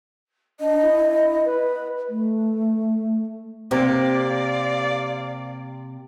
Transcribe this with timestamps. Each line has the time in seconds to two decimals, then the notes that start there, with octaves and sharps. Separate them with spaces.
0.60 D4 D#5
0.82 E4
1.45 B4
2.09 A3
3.71 C3 A#3 C4 G4 D5 F5